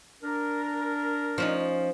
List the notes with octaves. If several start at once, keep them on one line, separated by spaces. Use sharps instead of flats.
D4 A#4
F3 C#4 D#4